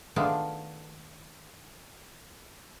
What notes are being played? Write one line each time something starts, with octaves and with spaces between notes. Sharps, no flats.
D#3 A3 B3 D4 F4 G#4